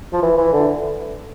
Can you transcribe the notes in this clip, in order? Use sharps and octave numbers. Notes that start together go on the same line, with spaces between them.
F3
E3
E3
D3